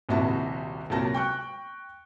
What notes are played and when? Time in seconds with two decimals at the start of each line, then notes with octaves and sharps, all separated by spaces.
0.09 D#1 A#1 C3 E4 F#4 A5
0.90 C2 A#2 F#3 A5 A#6
1.14 G5 C#6 F#6